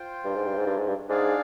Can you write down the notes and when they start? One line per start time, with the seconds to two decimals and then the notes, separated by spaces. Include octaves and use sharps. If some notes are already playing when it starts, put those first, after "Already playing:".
Already playing: F4 C5 G5
0.25 G2
0.35 G#2
0.46 G2
0.57 G#2
0.66 G2
0.77 G#2
0.87 G2
1.09 G#2 D4 G#4 D5 F5